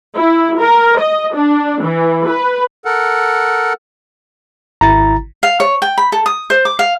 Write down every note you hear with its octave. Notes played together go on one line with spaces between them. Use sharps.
E4
A#4
D#5
D4
E3
B4
A4 A#4 F#5
G#1 E4 A#5 A6
F5
C#5
G5
B5
A4
D#6
C5
D6
F5